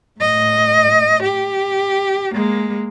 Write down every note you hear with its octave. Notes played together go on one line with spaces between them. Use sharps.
A2 D#5
G4
G#3 A#3